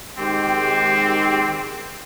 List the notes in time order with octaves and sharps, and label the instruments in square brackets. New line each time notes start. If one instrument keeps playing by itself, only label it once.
[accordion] D#3 G#3 G4 [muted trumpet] C4